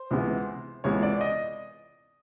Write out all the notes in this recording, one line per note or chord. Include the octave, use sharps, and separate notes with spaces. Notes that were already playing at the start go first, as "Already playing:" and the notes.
Already playing: C5
C#2 C3 E3 G#3 B3
C#2 C3 E3 G#3 B3 C#5
D5
D#5